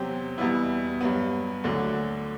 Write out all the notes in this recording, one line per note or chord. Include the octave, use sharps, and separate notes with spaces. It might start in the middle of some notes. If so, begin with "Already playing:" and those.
Already playing: E2 C3 F#3 C4 G4
E2 B2 G3 B3 E4
G2 F#3 B3
D2 D3 F#3